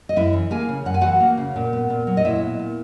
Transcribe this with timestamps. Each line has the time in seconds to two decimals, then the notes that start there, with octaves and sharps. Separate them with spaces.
0.09 D#5
0.16 F#2 E4 E5
0.33 E3
0.51 A#3 G#4 G#5
0.69 C#3
0.85 F#2 F#5
0.94 G#5
1.01 E3 F#4 F#5
1.20 A#3
1.37 C#3
1.56 A#2
1.73 B3
1.90 A#2
2.07 F#3
2.17 D#5
2.24 A#2 E4 E5
2.42 B3
2.59 A#2